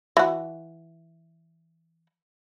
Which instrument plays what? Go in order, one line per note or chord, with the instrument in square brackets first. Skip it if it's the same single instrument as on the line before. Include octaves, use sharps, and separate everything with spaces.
[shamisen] E3 F#4